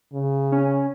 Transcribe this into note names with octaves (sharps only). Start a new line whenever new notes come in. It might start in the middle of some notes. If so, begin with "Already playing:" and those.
C#3
C#4